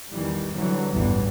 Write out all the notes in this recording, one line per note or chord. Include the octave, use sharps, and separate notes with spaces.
E2 D#3 E3 G3
D3 E3 F#3 G3
A1 E2 G2 E3 G3 B3